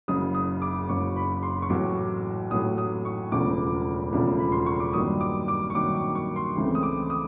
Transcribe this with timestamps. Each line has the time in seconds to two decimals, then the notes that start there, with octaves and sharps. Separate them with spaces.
0.08 F#1 F#2 C#3 D#6
0.35 D#6
0.62 D6
0.89 F#1 F#2 C#3 C#6
1.16 B5
1.43 C6
1.62 C#6
1.70 A1 A2 F#3 D6
2.51 A1 A2 F#3 D#6
2.78 D#6
3.05 C#6
3.32 E1 E2 C#3 F3 A3 D6
4.12 E1 E2 C#3 F3 A3
4.39 B5
4.52 C6
4.66 C#6
4.80 D6
4.93 G2 D#3 F#3 A#3 D#6
5.21 D6
5.48 D6
5.70 C#6
5.74 G2 D#3 F#3 A#3 D6
5.95 D6
6.15 C#6
6.36 C6
6.56 C#2 C#3 E3 A3 C4
6.75 D#6
6.83 D6
7.10 D#6